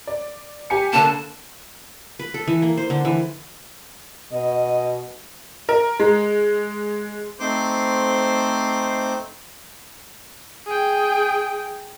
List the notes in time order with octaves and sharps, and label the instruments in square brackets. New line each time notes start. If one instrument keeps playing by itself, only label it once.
[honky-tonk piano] D5
G4 G#5 C#7
[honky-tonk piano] D3 A#3 [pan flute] A5
[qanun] B4
A4
E3
A#3
C5
D3
E3
[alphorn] B2 [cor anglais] D#5
[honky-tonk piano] A#4
G#3
[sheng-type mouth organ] A3 C4 D#4 C5 C6 D6
[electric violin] G#4 G5